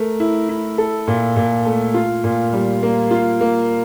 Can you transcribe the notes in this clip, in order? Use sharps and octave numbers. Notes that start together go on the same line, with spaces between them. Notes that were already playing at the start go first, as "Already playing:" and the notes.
Already playing: A3 A#4
E4
E4
A4
A#2
A#2
A3
F4
A#2
G3
A#3
F4
A#3